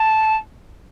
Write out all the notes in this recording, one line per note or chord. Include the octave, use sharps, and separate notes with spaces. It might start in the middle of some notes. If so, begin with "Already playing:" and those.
Already playing: A5